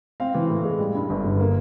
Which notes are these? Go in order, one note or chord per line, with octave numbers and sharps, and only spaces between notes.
C4 F5
E3
A2
G#3
G3
G2
G1
D3
A#3